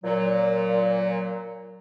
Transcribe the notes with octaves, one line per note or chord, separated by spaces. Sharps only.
A#2 F#3